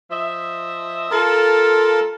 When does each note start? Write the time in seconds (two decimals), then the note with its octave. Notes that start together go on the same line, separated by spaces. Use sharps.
0.10 F3 D#5 E5
1.11 F4 A4 A#4 A5